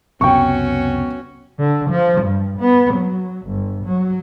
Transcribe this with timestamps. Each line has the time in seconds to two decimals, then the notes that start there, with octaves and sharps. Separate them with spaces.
0.21 C#2 F#2 C3 B3 C#4 F#4 G5 C#6
1.59 D3
1.90 F3
2.21 G2
2.59 B3
2.94 F#3
3.47 G1
3.85 F#3